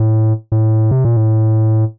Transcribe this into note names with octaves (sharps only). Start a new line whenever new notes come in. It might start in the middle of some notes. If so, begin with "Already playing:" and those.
Already playing: A2
A2
C3
A#2
A2